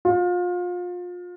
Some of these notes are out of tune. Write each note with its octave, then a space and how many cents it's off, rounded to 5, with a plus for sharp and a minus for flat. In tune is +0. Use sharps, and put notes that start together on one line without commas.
F4 +30